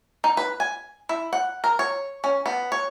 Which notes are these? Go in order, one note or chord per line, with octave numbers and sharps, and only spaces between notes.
D#4
B4
G#5
E4
F#5
A#4
C#5
C#4
B3
C#5